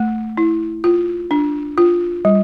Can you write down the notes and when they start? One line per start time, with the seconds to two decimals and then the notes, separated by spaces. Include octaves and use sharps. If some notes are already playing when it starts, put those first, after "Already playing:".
Already playing: A3
0.37 E4
0.84 F4
1.31 D4
1.78 F4
2.25 G3